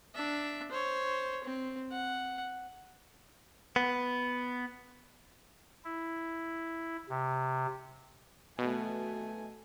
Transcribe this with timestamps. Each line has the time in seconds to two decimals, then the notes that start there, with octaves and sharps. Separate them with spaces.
0.15 D4 E5
0.72 C5 C#5
1.44 C4
1.91 F#5
3.76 B3
5.85 E4
7.09 C3
8.59 B2 A3 G#5